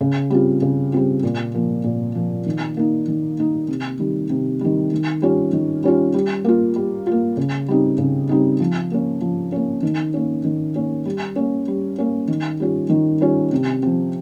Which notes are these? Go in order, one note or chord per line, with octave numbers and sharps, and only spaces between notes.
C#3
G3 C4 F4
C#3
G3 C4 F4
A#2
F3 A#3
A#2
F3 A#3
D#3
A#3 D#4
D#3
A#3 D#4
C3
D#3 G3
C3
D#3 G3
D#3
G3 C#4 F4
D#3
G3 C#4 F4
G3
A#3 F4
G3
A#3 F4
C#3
G3 C4 D#4
C#3
G3 C4 D#4
F3
A#3 C#4
F3
A#3 C#4
D#3
A#3 C#4
D#3
A#3 C#4
G3
A#3 C#4
G3
A#3 C#4
D#3
G3 C#4 F4
D#3
G3 C#4 F4
C3
F3 C4